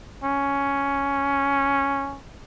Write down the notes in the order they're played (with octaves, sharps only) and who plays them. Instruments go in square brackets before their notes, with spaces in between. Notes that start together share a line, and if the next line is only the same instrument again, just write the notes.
[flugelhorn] C#4